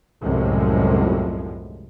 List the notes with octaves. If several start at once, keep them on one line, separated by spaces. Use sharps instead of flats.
C2 F#2 A2 C3 F3 G#3